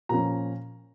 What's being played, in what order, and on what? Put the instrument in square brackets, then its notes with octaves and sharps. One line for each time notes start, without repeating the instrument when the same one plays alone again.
[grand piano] A#2 F3 C#4 A#5